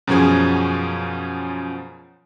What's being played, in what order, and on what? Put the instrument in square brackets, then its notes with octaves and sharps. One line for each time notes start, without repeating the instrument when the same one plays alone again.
[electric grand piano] F#2 B2 F3 C#4 G#4 G#6